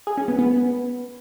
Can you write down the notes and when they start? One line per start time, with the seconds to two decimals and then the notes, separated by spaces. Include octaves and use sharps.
0.07 G#4
0.17 C#4
0.28 B3
0.39 B3